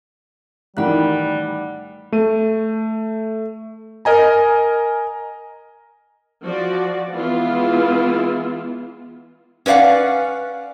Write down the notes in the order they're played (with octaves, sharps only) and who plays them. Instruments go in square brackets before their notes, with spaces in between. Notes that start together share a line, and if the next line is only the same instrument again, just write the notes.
[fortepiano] A1 D#3 [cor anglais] G3 [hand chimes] F#5 F#6
[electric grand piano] A3 D#7
A#4 D#5 G#5 A#5
[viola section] F3 F#4 D5
E3 G#3 B3 E4 F4
[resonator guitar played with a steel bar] C#4 B4 D5 F5 F#5